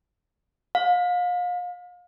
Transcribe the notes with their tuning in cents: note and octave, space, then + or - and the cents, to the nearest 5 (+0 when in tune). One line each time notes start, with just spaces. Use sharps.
F5 +35